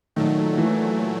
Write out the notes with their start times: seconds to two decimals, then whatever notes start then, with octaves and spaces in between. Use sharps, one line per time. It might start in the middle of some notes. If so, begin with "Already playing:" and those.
0.16 A#2 D#3 F#3 A3
0.58 E3